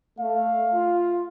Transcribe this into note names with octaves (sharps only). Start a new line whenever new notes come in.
A3 F5
F4